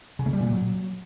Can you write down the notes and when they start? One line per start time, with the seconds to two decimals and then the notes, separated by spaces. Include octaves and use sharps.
0.19 C#3
0.26 A3
0.33 G3
0.40 A#2
0.47 F#3